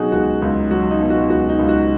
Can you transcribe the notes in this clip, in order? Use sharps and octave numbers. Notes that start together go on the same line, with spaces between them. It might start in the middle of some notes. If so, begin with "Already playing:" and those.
Already playing: B2 F#3 D#4 F#4 G#4
C#2 F#4
C#2 D#4
F#3 F#4
D#4
B2
F#4
C#2 F#4
D#4
C#2
F#4